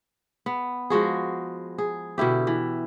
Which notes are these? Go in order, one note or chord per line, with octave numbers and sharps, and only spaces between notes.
B3
F3 G#3 F#4 G#4
G#4
B2 D3 E4 G4
E3